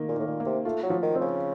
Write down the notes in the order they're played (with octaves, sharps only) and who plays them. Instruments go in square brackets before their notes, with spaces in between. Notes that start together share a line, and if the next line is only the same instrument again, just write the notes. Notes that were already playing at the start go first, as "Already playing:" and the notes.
Already playing: [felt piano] D#3 A#3
[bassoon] A#2
[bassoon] A2 [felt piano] D#3
[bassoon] A#2
[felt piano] A#3
[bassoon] C3
[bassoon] A3 [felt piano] F4
[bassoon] F#3
[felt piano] F3
[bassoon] D#3
[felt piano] C4
[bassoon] C#3